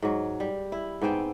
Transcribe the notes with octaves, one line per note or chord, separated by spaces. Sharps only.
G#2 F#3
G3
E4
G#2 B3 C4 G5